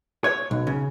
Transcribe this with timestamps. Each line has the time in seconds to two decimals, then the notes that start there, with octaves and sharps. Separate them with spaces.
0.24 C#5
0.51 B1
0.67 C#3